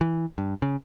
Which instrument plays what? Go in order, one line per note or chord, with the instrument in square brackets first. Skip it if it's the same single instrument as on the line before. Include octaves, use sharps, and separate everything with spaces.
[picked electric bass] E3
G2
C#3